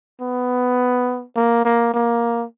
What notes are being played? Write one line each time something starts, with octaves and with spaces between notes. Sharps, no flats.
B3
A#3
A#3
A#3